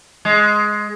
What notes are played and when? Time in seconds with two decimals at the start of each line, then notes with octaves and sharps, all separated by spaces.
0.25 G#3